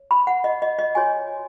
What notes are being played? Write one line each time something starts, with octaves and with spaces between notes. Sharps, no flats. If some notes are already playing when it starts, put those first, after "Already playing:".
Already playing: C#5
B5
F#5
D#5
D#5
D#5
F#4 C#5 G#5